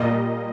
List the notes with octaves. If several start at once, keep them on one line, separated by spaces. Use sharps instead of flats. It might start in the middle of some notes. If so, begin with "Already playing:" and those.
Already playing: A#2 G3 A#3 D#5